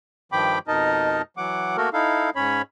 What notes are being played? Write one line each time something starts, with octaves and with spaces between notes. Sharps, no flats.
G2 D#3 F3 G5 B5 D6
F2 B2 D#4 A#4 D#5 A5
E3 F#3 F#5 D6
A3 A#3 F#4 A4 A#4
D#4 E4 A4 F5
G#2 C#4 C#5 B5